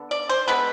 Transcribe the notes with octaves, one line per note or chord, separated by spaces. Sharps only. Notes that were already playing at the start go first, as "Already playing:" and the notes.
Already playing: D3 B3
D5
C5
D3 G#3 B3 B4